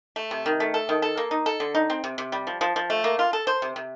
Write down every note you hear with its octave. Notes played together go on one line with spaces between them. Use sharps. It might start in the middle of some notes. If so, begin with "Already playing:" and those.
A3
C3
D#3
A3
A4
D#3
A4
A#3
D#4
A4
D3
D#4
C4
C3
C3
G3
F3
F3
F3
A3
A#3
F4
A4
C5
C3
C3